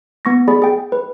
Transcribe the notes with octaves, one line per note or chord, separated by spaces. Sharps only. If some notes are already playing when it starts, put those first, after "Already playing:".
B3 C#6 A#6
G#4 D5 B5
G#4 G5
B4